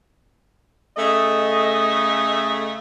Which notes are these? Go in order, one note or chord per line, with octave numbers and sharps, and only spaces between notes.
C#3 A3 D#5